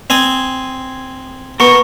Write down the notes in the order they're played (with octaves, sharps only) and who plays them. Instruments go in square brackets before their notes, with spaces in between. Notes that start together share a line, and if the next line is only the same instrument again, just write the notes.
[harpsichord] C4 G#5 D#6
[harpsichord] B3 [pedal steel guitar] A#4 C#6